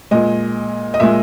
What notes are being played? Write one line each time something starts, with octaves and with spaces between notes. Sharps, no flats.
A#2 G#3 D#5
D#5
A#2 G#3 E5